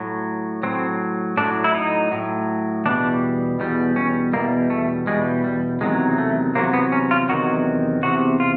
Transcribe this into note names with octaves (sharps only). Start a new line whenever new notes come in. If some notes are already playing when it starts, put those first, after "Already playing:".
Already playing: A2 F#3
A2 F#3 C4
A2 F#3 D4
E4
D#4
A2 F#3
E2 B2 G3 D4
E2 B2 G3
C#4
E2 B2 G3 A#3
A3
E2 B2 G3 G#3
G3
E2 C3 D#3 F#3 G#3
A3
E2 C3 F#3 A#3
B3
C#4
F4
E2 C3 D#3 F#3 F#4
E2 C3 F#4
F4